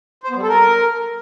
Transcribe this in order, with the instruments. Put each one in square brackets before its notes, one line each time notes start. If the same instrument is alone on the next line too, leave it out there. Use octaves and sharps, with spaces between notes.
[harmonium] C5
B3
G3
A4
A#4